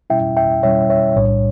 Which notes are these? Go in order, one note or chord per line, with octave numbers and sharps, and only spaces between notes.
B2 G3 C#4 E4 E5 G5
E5 G5
B2 G3 C#4 E4 C#5 E5
C#5 E5
B1 A2 G3 D4 C#5